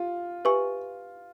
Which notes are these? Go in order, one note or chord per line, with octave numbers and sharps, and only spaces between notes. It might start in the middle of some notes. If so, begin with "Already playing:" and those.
Already playing: F4 G4
G4 B4 E5 G#5 C#6